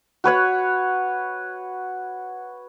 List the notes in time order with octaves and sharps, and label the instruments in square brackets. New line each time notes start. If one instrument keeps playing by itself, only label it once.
[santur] F#4 B4 C#5 F#5